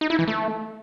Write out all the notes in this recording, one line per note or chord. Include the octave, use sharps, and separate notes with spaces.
D#4
E4
E3
A3